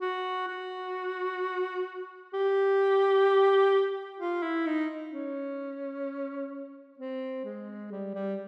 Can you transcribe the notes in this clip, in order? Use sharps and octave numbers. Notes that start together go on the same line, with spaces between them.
F#4
F#4
G4
F4
E4
D#4
C#4
C4
G#3
G3
G3